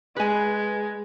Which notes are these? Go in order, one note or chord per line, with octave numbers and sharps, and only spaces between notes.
G#3 B4 G#5